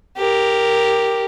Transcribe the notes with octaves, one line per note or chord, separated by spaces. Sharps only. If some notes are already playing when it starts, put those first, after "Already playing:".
G4 A#4